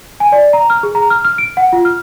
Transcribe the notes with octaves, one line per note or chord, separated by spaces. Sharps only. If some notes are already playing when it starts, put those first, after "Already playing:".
G#5
D5
A#5
F6
G#4
A#5
F6
F6
D7
F#5
F4
F6